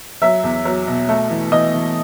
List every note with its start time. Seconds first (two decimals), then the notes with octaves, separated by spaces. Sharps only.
0.22 F#3 E5
0.43 E2
0.65 F#3
0.87 B2
1.09 A3
1.30 E3
1.52 E3 D#5
1.74 E3